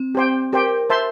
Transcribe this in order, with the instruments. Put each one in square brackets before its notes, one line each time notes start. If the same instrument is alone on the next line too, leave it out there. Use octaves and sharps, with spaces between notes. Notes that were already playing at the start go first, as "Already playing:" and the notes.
Already playing: [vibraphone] C4
[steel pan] G4 C5 G5
[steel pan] G4 C5 G5 [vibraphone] A#4
[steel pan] C5 E5 A5 C6